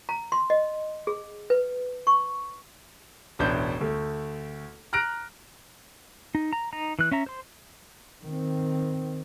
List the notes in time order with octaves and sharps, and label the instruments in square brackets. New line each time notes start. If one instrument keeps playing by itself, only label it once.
[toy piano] A#5
C6
D#5
G#4
B4
C#6
[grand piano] E1 A1 D4 G6
D2 A3
A#5 F6 F#6 A#6 D7
[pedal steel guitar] D#4
A#5
D#4 A#5
E3 F#6
C#4 E5 A#5
C5 C6
[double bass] D#3 C4